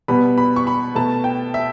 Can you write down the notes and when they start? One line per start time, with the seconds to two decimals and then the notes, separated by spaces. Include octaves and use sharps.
0.08 B2 G3 B3 B5
0.38 B5
0.56 C#6
0.67 B5
0.95 B2 A3 A5
1.24 G5
1.54 E5